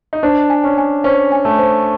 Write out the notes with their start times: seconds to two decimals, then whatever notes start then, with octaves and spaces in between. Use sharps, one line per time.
0.13 D#4
0.23 D4 C5
0.50 G#5
0.64 C#4
0.78 G#5
1.04 C#4 C5
1.32 G#5
1.45 A3
1.59 C5